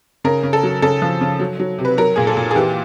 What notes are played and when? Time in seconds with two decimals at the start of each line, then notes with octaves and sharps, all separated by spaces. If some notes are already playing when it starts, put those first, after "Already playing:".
0.25 C#3 A#4
0.43 C#3
0.53 A4
0.63 F#3
0.82 C#3 A4
1.02 F3
1.21 C#3
1.40 F#3
1.60 F#3
1.78 C3
1.85 B4
1.98 F#3 A#4
2.16 A#2 G#4
2.27 A4
2.37 A#2
2.51 G#4
2.56 E3 G4